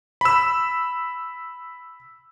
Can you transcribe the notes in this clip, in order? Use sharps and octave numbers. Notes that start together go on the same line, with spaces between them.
B5 E6